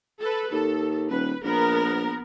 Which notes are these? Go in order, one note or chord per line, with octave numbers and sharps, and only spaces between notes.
A4 B4
D#2 A4
D#1 B4
A#1 B3 A#4